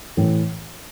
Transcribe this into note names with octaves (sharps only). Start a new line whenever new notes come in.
A2 E3